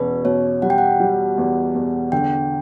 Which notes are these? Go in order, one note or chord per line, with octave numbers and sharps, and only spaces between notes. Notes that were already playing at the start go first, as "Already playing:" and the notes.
Already playing: E2 B2 C#4 B4
B2 C#5
G3 F#5
G5
F#5
G3
E2
E2
D3 G5